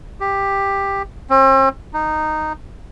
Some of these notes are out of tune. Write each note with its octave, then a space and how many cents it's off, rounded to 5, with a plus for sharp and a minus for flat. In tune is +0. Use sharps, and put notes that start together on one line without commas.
G4 +10
C4 +45
D#4 -10